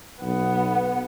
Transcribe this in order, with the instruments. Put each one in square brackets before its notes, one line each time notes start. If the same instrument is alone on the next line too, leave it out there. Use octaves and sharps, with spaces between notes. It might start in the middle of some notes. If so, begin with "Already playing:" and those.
[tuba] B1 [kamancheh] B3